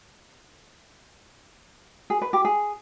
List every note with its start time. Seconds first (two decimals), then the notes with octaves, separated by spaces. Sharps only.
2.10 G#4
2.22 B4
2.33 G4
2.45 G#4